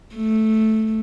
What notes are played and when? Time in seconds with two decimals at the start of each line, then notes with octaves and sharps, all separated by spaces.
0.15 A3